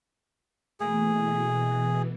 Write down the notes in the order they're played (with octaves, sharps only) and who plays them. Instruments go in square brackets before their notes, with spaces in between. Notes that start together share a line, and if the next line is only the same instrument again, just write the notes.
[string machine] B2 E3 [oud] A3 A#3 E4 [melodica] G#4